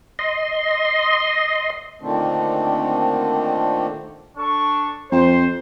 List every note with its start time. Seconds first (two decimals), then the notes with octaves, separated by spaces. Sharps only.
0.19 D#5 C6
2.02 A#2 D3 D#3 A3 C4 D4
4.37 D4 A4 C#6
5.12 F2 C5